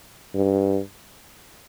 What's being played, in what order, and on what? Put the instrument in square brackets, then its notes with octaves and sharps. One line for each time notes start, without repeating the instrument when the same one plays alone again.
[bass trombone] G2